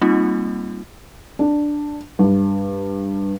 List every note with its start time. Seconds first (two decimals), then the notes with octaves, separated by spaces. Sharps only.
0.01 G3 A#3 C4 D#4 F4
1.39 D4
2.19 G2